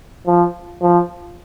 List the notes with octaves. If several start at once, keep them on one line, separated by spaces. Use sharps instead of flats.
F3
F3